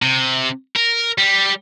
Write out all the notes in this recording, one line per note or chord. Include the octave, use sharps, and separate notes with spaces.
C3
A#4
G3